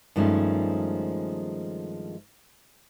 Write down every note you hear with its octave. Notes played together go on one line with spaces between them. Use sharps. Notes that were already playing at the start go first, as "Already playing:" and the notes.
G2 D#3 F3 G#3 A3 C#4